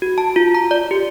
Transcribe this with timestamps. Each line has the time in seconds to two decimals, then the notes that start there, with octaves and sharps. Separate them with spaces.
0.02 F#4
0.18 A5
0.36 F4
0.55 A#5
0.71 D5
0.91 G4